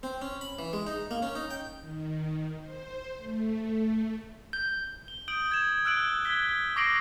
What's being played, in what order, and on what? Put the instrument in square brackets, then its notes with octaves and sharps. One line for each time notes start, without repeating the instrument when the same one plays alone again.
[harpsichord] C4
C#4
B5
E3
G#3
D#4
A#3
C#4
D#4
G5
[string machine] D#3
C5
A3
[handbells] G6
[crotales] G7
D#6 G6 D7 F#7
G#6 E7
E6 F#6 D7 F#7
F#6 G#6 B6 G7
C#6 D6 A#6 C7 D7 F#7